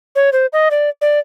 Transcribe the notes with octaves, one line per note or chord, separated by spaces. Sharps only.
C#5
C5
D#5
D5
D5